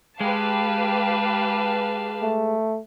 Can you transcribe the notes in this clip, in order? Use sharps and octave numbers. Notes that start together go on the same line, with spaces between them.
G#3 G4 B4 F5 A5
A3